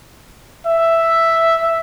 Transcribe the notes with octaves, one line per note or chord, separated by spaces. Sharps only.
E5